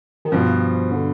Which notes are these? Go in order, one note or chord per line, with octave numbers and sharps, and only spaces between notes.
D#3
G2 B2 F3
D3